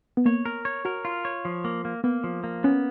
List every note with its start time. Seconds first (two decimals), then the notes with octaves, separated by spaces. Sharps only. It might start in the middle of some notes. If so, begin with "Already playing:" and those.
0.17 B3
0.26 A#3 C#5
0.46 A#4
0.65 C#5
0.85 F#4 A#4
1.05 F4
1.25 C#5
1.45 F3
1.65 A#3
1.85 A#3
2.04 A#3 B3
2.24 F3
2.44 A#3
2.64 B3 C#4